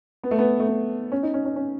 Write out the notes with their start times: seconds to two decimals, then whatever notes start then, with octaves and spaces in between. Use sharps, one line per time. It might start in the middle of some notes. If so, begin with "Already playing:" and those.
0.24 B3
0.31 A3
0.39 B3
0.60 A3
0.67 B3
1.12 C#4
1.23 D#4
1.34 C#4
1.45 C#4
1.56 C#4